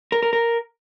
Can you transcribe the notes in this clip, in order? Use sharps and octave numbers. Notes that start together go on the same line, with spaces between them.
A#4
A#4
A#4